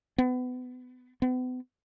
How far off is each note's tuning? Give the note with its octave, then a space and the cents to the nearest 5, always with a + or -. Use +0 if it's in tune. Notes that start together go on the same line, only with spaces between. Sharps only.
B3 +30
B3 +40